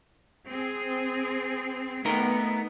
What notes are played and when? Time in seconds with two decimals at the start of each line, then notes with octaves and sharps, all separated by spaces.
0.46 C4 G#4
2.05 A3 B3 D#4 A#4